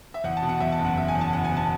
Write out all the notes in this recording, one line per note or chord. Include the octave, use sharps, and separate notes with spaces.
E5
E2 F#5
A5
B2
F#5
E2 E5
A5
F#1
F#5
F#1 E5
G#5
E2
A5
F#1 F#5
G#5
B2
A5